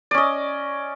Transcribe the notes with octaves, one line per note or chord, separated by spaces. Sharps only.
C#4 D5 D#5